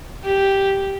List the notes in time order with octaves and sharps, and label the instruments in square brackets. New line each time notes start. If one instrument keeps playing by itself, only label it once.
[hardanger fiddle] G4